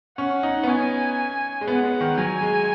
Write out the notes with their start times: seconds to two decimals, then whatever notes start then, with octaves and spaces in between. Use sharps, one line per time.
0.18 C#4 F#5
0.43 D#4
0.63 B3
0.67 C#4 G#5
1.61 G#3
1.67 B3 F#5
1.84 G#3
2.01 D#3
2.18 F#3 G#5
2.42 G#3